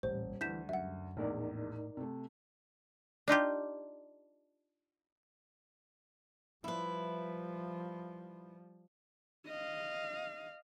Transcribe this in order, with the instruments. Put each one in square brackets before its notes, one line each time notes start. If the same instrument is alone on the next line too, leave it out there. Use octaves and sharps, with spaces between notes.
[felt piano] D#1 [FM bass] A1 [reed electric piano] G3 [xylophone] C5
[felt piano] D2 [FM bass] E3 [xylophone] G6 B6 E7
[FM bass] F#2 [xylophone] E5 F#5
[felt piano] A#1 E2 [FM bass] A2 [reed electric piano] D#4 A#4 D5
[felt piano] C3 A3
[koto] D4 D#4 F4 G4
[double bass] F3 G3 [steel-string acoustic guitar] E4 B4
[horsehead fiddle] D#5 F5